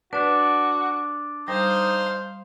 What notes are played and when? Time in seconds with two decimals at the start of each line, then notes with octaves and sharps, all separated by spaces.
0.13 D4 F#4 B4 D5
1.48 G3 D#4 C5 F5